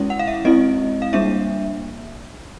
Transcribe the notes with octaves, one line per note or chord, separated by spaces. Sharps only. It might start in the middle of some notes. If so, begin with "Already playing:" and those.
Already playing: G#3 C#4 E4
F#5
F5
E5
G#3 C4 E4 D#5
F5
G3 A#3 D4 E5